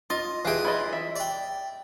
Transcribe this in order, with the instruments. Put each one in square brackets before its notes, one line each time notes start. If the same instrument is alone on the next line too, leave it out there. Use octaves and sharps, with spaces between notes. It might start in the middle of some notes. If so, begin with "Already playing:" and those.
[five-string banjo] F4 [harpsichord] D#5
[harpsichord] E3 G#4 [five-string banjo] F5 G5
[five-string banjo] E4 F4 D#5
E5
[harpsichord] D5 G5